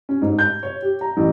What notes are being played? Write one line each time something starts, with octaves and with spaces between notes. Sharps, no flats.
C#4
G#2
G6
C#5
G4
A#5
A1